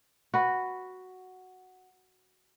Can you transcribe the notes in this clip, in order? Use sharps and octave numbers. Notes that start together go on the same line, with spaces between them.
F#4 B4